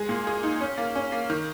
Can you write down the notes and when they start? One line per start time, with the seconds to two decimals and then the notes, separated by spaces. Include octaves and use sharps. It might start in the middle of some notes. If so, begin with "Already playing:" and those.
Already playing: G#3 G#4
0.09 A#2
0.27 G#4
0.43 D#4
0.61 C#4
0.78 A#3
0.95 C#4
1.12 A#3
1.30 D#3